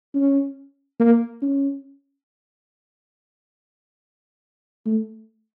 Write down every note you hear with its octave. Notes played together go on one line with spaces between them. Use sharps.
C#4
A#3
C#4
A3